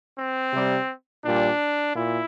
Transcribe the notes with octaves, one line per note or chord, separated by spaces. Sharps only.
C4
C3 G3
A#2 G3 D4
A#2 E4